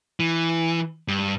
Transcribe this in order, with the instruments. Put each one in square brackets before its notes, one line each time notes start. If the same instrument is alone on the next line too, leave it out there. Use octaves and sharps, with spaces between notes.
[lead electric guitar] E3
G2